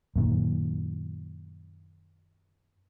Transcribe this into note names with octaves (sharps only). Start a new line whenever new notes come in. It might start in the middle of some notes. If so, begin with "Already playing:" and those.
F#2 A#2 D#3